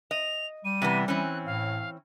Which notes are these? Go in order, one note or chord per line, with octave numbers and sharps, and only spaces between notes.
D#5 F7
G3 D#7
C3 E3 B3
E3 C4 C#4 F#6
A2 F5